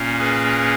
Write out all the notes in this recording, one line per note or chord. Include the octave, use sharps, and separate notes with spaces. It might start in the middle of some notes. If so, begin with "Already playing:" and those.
Already playing: A#2 A#3 C#4
G#4 B4